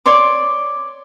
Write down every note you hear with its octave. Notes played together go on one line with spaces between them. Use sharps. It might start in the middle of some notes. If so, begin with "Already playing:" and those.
C#5 D5 C6 D6